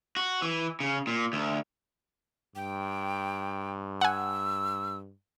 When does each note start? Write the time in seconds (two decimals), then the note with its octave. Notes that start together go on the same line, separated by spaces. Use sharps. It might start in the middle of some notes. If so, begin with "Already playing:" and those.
0.16 F#4
0.42 E3
0.80 C#3
1.07 A#2
1.33 D2
2.56 G2 G5
4.01 F#5 G#5 E6